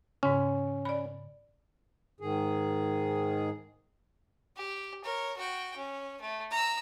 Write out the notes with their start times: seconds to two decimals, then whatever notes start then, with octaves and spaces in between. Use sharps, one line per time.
0.23 G#2 C#3 C#4
0.85 D5 B5
2.20 G#2 D#3 G#4
4.57 G4
5.04 A#4 C#5
5.37 F#4 G5
5.76 C#4
6.21 A3
6.51 A#5 E6